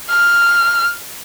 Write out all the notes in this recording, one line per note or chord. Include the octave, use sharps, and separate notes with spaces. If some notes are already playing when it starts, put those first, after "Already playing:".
F6